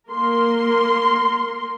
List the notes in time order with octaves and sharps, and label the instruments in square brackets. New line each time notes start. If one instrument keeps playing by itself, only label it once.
[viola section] A#3 A#4 C6